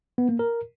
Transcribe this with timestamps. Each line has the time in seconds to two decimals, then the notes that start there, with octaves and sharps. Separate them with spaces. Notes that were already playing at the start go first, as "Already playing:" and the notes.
0.18 B3
0.29 A#3
0.39 A#4